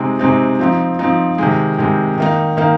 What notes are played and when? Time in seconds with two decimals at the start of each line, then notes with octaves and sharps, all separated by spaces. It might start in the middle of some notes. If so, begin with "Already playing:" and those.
Already playing: C3 G#3 C4 D#4
0.19 C3 G#3 C4 D#4
0.59 F3 C4 D#4
0.99 F3 C4 D#4
1.38 C3 D#3 G#3
1.78 C3 D#3 G#3
2.18 D#3 A#3 D#4
2.57 D#3 A#3 D#4